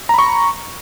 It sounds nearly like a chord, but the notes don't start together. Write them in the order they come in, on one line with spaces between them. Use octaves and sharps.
A#5 B5 C#6